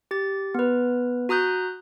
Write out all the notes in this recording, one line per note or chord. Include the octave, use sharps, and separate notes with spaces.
G4 A6
B3 B4
F#4 A#5 D#6 F#6 G6